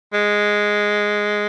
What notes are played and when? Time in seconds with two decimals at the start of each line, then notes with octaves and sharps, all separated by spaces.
0.13 G#3